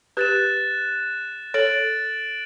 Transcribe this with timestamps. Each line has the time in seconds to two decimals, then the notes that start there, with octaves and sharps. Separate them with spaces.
0.17 G4 B4 F#6 A6 E7
1.54 A4 C#5 A6 D7 F#7